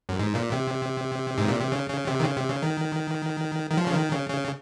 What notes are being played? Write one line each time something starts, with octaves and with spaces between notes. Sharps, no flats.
F#2
G#2
A#2
C3
G#2
A#2
C3
C#3
C#3
C3
D#3
C#3
C3
C#3
D#3
D#3
F3
C#3
D#3
C#3
C#3